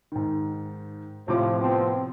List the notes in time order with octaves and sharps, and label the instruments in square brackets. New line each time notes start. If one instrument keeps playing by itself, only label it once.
[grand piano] G#2 D#3
[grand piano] A2 C3 D6 [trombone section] F3
[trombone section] F3 B3 C4